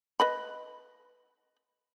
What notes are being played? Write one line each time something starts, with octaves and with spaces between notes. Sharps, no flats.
B4 D#5 B5